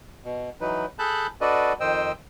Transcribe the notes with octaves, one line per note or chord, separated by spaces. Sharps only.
B2
E3 F#3 D#4 B4
G#4 A4 A5 B5 F#6 G6
D4 F#4 A4 B4 D5 D#5
F2 D#3 C5 D#5 G5 E6